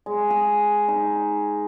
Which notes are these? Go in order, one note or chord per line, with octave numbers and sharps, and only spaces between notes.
G#3
G#4
D#4